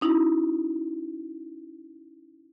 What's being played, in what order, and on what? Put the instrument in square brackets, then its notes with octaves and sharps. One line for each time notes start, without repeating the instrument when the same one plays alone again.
[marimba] C#4 D#4 E4 F#4